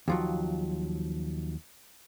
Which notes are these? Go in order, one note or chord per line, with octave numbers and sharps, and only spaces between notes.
D#2 F3 F#3